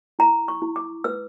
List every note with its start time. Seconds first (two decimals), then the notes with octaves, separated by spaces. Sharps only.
0.19 E4 A#5
0.48 C#6
0.62 E4
0.76 D6
1.04 B4 E6